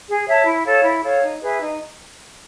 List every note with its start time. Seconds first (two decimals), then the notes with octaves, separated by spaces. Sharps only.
0.08 G#4
0.27 C#5 E5 A5
0.46 E4
0.65 A4 C#5 F5
0.84 E4
1.04 A4 C#5 F5
1.23 D#4
1.42 G#4 B4 E5
1.61 D#4